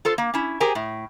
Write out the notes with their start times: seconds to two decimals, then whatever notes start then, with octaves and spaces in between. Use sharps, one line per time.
0.05 F4 A4 C5
0.18 A#3
0.34 C#4 E4
0.60 G4 G#4 A#4 C5 G#5
0.75 A2